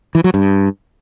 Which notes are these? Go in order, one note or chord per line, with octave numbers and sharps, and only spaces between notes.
E3
F#3
G2